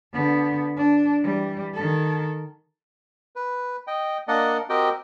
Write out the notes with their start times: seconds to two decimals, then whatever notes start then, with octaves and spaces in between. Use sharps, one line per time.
0.14 D3 B3
0.77 D4
1.22 E3 G3
1.74 D#3 A4
3.36 B4
3.87 D#5 G5
4.28 A#3 D4 A#4 D5 D#5 F#5
4.69 C4 F#4 G4 A#4 D#5 G5